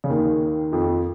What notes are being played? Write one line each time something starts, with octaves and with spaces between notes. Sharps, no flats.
C#3
D#2 D#3
F2 F3